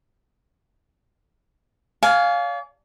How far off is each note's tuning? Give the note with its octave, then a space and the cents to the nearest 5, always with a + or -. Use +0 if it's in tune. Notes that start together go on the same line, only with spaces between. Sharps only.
D5 -45 F5 +5 G#5 +10